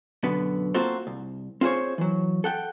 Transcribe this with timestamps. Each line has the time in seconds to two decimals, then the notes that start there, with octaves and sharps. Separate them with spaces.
0.23 F#2 B2 D3 B3
0.74 A#3 C4 F4 F#4 A4 C5
1.07 C2
1.61 C4 F4 G#4 A4 C5 C#5
1.98 E3 F#3
2.44 A4 F#5 G5